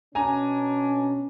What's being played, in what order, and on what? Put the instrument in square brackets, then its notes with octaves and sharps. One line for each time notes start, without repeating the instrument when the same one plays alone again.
[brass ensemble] B2 C#4 [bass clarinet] D4 [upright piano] G#5 A#5